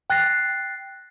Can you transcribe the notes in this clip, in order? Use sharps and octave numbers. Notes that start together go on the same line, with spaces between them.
G5 F#6 A6 A#6 C7